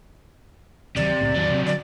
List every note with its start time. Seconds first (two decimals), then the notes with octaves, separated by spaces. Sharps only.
0.96 D1 C3 D#3 F#3 D5
1.21 C2 A2 C#3
1.36 E2 D#3 F#3 C4 D4
1.51 C3 C4
1.66 D3 D5